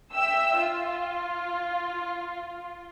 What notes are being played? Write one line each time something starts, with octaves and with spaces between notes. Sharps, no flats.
E5 G5 E6
F4